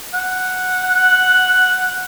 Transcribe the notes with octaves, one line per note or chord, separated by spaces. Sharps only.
F#5
F#6